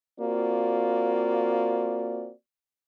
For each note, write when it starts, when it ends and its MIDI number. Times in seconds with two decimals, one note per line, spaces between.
0.19 2.31 58
0.19 2.31 60
0.19 2.31 65
0.19 2.31 66
0.19 2.31 74